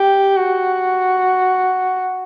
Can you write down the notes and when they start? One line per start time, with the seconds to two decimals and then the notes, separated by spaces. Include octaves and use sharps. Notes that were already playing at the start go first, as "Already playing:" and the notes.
Already playing: G4
0.36 F#4